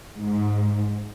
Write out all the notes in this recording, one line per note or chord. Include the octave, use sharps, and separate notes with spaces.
G#2